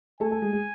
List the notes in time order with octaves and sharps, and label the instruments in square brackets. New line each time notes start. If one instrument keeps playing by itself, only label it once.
[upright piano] A3 A4 [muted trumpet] G#5
[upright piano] A3 A4
G#3 G#4
G#3 G#4